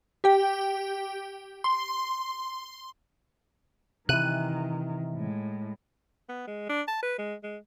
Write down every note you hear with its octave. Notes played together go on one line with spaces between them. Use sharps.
G4 G5
C6
C3 D#3 E3 F#6 D#7
A2 G#3
B3
G#3
D4
A5
B4
G#3
G#3